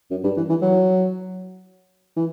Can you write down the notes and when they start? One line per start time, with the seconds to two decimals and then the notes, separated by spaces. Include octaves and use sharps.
0.11 F#2
0.24 G2
0.37 E3
0.49 E3
0.62 F#3
2.17 E3